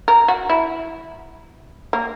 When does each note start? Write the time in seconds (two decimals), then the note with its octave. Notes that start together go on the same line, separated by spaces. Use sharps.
0.08 A#4
0.28 F#4
0.49 E4
1.93 A#3